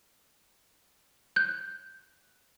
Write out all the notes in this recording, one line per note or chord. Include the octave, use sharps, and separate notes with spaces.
F#6 G6